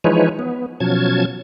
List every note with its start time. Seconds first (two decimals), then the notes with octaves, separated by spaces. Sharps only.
0.04 E3 F3 G#3 D#4 B4 C#5
0.39 B3
0.80 B2 F3 F#3 C#4 A5 G#6